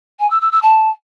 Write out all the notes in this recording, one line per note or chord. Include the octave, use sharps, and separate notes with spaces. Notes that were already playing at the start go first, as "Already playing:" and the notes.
G#5
E6
E6
E6
A5